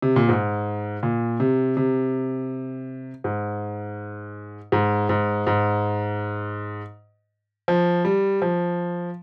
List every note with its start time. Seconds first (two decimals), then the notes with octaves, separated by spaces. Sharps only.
0.02 C3
0.16 A#2
0.29 G#2
1.03 A#2
1.40 C3
1.77 C3
3.24 G#2
4.72 G#2
5.09 G#2
5.47 G#2
7.68 F3
8.05 G3
8.42 F3